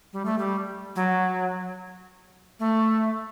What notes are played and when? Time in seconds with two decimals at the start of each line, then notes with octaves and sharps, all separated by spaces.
0.13 G3
0.25 A3
0.38 G3
0.96 F#3
2.60 A3